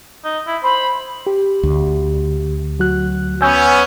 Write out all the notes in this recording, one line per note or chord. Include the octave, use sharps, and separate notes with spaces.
D#4
E4
C5 B5
G4
D2
F#3 F#4 F#6
B3 C#4 G#5 E6 G6